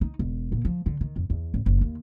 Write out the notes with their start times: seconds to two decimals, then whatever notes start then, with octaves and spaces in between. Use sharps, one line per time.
0.01 D#4
0.19 E1
0.52 A#2
0.65 F3
0.86 D3
1.01 D#3
1.16 F2
1.30 E2
1.54 G#1
1.66 F#1
1.81 D#2